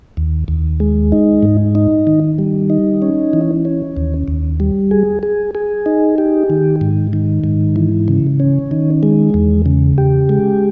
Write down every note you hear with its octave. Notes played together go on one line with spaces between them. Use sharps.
D#2
D#2
G#3
D#4
G#2
D#4
D#3
G3
D#4
C#4
E3
C#4
D#2
D#2
G3
G#4
G#4
G#4
D#4
G4
D#3
G#2
D#3
G#2
E3
C#3
C#4
D#3
G#3
E2
C#3
G4
G#3